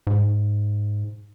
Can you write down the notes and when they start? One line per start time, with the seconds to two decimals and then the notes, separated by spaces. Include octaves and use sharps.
0.07 G#2